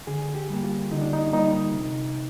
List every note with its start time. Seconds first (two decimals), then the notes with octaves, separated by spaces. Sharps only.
0.07 D3 G#4
0.35 G4
0.50 G3 A#3
0.63 F4
0.91 D3 D#4
1.01 D4
1.13 D#4
1.33 G3 A#3 D#4
1.74 C3